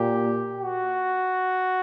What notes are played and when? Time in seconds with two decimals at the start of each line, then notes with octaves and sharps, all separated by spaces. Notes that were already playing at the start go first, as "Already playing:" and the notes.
Already playing: A#2 G4
0.58 F#4